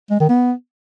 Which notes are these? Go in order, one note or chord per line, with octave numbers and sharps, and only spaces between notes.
G#3
D#3
B3